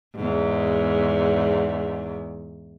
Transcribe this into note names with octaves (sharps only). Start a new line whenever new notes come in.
E2 G#2